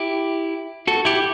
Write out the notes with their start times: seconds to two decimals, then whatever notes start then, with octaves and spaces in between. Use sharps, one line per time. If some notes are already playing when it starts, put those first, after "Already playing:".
Already playing: E4 G4
0.87 F#4 A4
1.05 E4 G4